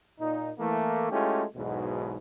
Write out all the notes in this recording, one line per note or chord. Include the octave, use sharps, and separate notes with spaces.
A#2 D#4
E3 A3 A#3
G#3 A3 C#4 E4 F4 G4
B1 E2 G#2 B2